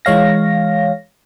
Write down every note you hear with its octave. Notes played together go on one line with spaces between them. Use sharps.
E3 G#3 C#5 F5 A#6